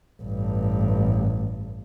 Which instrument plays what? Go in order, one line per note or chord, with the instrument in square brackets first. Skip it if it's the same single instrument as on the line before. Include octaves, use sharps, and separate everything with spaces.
[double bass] A1 G2